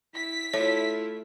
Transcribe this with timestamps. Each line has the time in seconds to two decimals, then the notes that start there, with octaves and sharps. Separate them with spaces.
0.14 E4 B6
0.54 A3 E4 F4 C#5